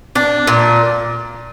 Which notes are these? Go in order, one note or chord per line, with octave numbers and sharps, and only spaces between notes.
D4
A#2